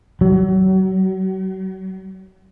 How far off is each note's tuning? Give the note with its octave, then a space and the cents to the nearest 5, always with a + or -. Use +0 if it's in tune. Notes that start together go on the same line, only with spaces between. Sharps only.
F#3 +35